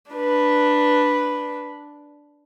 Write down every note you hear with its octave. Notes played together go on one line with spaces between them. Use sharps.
D4 B4